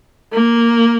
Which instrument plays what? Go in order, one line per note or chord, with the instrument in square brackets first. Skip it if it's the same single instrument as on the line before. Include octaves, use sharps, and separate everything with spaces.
[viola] A#3